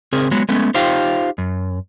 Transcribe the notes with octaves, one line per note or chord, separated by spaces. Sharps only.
C#3 C4 G#4 A#4
F#3 G#3 B3
G#3 A3 B3 C#4
D#4 F4 G4 C5 F5 G5
F#2